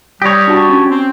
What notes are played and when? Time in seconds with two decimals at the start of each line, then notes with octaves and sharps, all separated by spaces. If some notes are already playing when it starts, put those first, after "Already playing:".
0.22 G3 G4 C#5 D#6 A#6
0.47 D4 F#4 A5
0.69 C#4
0.89 C4